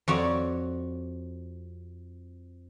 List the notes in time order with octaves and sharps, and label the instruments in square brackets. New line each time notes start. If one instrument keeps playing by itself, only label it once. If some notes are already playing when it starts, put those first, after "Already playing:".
[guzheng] F2 F#4 C#5 D5